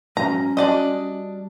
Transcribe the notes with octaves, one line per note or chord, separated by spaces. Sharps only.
G#2 F#3 C#4 A#5
G3 D4 F#4 D5 D#5 G#5